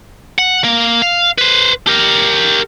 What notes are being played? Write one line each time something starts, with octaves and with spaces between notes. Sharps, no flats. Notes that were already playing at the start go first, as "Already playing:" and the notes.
F#5
A#3
F5
B4 C5
G4 A#4